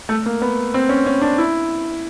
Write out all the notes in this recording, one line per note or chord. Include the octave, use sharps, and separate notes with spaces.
A3
A#3
B3
C4
C#4
C#4
D4
E4